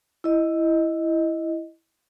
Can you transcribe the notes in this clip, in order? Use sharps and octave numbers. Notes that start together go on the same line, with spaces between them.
E4 D#5